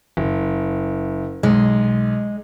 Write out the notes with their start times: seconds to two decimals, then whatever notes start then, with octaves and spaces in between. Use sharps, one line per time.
0.17 F#1
1.43 B1 G#3